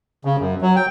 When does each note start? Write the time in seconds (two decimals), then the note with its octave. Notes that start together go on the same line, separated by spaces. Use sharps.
0.25 C#3
0.39 F#2
0.62 F#3
0.76 G5